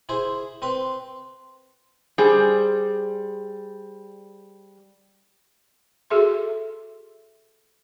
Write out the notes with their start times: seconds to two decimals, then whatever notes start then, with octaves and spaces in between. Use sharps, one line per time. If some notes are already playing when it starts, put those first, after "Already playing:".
0.09 E4 G#4 C5
0.62 C4 B4 C6
2.18 G3 G#4 C5
6.10 F#4 G#4 A4 E5 C6